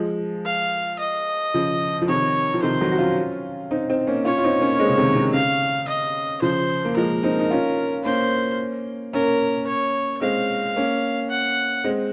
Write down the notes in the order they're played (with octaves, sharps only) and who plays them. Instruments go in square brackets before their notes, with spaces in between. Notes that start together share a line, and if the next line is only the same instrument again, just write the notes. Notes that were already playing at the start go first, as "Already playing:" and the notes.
Already playing: [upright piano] F3 G#3
[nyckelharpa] F5
D#5
[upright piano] C#3 F3
F3
[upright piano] C3 D#3 [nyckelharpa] C#5
[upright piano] F3
[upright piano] C3 D#3 [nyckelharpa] C5
[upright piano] D#3 F#3
F#4
C#4 F4
C4 D#4
C4 D#4
A#3 C#4
[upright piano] C#4 F4 [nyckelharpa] C#5
[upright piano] F4
C4 D#4
A#3 C#4
G#3 C4
C#3
C3 D#3
C3
[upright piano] C#3 [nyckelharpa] F5
[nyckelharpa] D#5
[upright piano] C#3 F3 [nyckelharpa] C5
[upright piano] A#3
[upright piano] F3 G#3 [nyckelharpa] A#4
[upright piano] C4 D#4
D#4
C#4 F4
[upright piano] A#3 C#4 [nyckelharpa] C5
[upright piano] A#3 C#4 [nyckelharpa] A#4
[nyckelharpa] C#5
[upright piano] G#3 C4 [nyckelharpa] F5
[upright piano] A#3 C#4
[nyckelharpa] F#5
[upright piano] G#3 C4